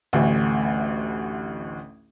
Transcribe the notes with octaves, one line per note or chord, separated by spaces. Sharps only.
A1 D2 A2